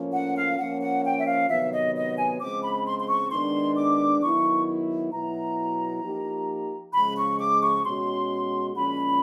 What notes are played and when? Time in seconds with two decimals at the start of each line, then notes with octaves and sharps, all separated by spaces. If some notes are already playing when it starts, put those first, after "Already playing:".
Already playing: A2 F3 A#3 C#4
0.13 F#5
0.36 F5
0.58 F3 A#3 C#4 F#5
0.81 F#5
1.04 G5
1.18 E5
1.26 F5
1.49 C3 D#3 F#3 B3 E5
1.72 D#5
1.95 D#5
2.17 G#5
2.40 C#3 F3 G#3 C4 D6
2.63 B5
2.86 C6
2.99 C6
3.08 C#6
3.31 D#3 G#3 B3 D4 C6
3.76 D6
4.21 D#3 F#3 B3 E4 C#6
5.12 B2 F#3 B3 E4 A#5
6.02 F3 A#3 D#4 G4
6.93 C#3 F3 G#3 B5
7.17 C#6
7.39 D6
7.62 C#6
7.84 B2 G#3 C#4 F#4 C6
8.75 A#2 F3 G#3 C#4 B5